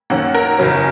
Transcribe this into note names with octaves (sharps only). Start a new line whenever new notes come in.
F#2 D#3 A#3 C#4 F#5
A#4
F#1 E2 C#3 F#3 C#4